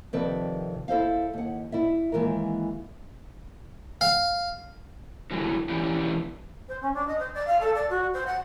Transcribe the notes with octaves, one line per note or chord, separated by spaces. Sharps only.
F2 C3 D#3 B4 D5 A5
E4 A4 C5 F5
D#2 F#5
E4 D5 E5
D#2 B2 E3 G#3 A#4
F5
D3 F#3 G3 E4
B2 E3 C#4 D4 E4 G4
C5
C#4
D4
D#5
C5
D5
F5
A4
D5
F#4
C5
F#5